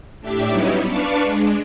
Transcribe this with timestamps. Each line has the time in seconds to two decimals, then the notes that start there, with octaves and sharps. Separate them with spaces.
0.20 A2 D4 G4 E5 D6
0.50 F#3 G3 B3 C#4 D#4 E4
0.84 D4 B4 F5 A5 C#6 D6
1.22 G#3 D4